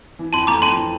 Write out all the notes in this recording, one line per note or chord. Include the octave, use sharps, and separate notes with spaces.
E3
F2 A5 C6
A3 A#5 D6
F2 A5 C6
E3